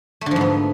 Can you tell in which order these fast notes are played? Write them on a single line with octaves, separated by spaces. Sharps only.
A3 D3 F3 G#2 B3